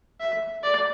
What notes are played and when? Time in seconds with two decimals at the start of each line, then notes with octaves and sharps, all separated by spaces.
0.20 E5
0.63 D5